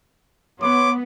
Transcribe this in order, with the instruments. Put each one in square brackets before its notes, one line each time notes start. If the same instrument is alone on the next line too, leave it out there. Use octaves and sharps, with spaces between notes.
[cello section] B3 [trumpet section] C#5 C6 D6